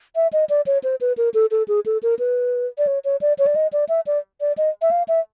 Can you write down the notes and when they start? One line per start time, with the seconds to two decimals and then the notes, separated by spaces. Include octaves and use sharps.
0.16 E5
0.33 D#5
0.49 D5
0.66 C#5
0.84 C5
1.01 B4
1.17 A#4
1.34 A4
1.51 A4
1.68 G#4
1.86 A4
2.03 A#4
2.19 B4
2.78 D5
2.87 C#5
3.05 C#5
3.21 D5
3.39 C#5
3.47 D5
3.56 D#5
3.73 D5
3.89 E5
4.07 D5
4.41 D5
4.58 D#5
4.82 E5
4.91 F5
5.08 E5